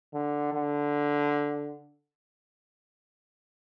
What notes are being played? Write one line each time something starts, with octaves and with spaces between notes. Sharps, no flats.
D3
D3